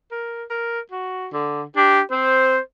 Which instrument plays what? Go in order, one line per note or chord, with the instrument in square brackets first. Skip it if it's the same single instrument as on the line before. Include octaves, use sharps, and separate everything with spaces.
[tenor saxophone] A#4
A#4
F#4
D3
[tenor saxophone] D4 [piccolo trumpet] G4
[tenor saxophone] C4 [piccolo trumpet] C5